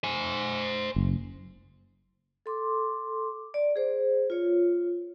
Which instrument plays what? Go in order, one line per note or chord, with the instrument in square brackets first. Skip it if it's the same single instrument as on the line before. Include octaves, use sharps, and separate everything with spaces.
[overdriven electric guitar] C5 G#5
[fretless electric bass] F#1
[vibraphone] A4 C6 D6
D5
G#4 C5
F4 C#5